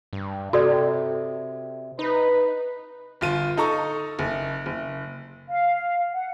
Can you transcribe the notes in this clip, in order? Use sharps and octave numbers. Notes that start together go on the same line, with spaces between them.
G2
C3 F#4 A4 D5
D#4 B4
G1 F4 D#7
D#4 A4 A#5 C#6
F#1
F#1
F5
F#5